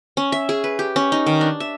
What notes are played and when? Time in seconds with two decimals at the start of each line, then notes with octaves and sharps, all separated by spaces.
0.17 C#4
0.32 E5
0.49 G#4
0.64 B4
0.79 G4
0.96 C#4
1.12 D#4
1.26 D#3
1.41 D4
1.60 E5